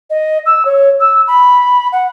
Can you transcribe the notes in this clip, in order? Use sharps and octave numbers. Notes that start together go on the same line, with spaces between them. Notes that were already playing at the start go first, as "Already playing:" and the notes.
D#5
E6
C#5
E6
B5
F#5